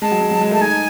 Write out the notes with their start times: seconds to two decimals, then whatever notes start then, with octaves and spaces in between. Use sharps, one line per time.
0.02 G#3 A5
0.11 F#3
0.21 G#3
0.31 F#3
0.41 G#3
0.51 A3 A5
0.61 D#4 G#5